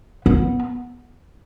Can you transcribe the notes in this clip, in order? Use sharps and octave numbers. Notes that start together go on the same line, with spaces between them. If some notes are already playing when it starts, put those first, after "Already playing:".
B3